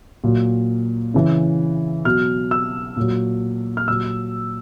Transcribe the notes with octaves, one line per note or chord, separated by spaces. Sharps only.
A#2 F#3
C#3 E3
B2 F#3 F6
E6
A#2 F#3
F6
A#2 F#3 E6